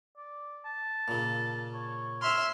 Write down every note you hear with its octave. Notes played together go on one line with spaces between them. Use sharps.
D5
A5
A#2 C#3
C#5
E5 C6 F6